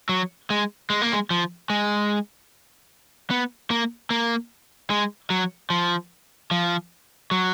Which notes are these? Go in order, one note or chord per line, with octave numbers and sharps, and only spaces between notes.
F#3
G#3
G#3
A#3
G#3
F3
G#3
B3
A#3
A#3
G#3
F#3
F3
F3
F#3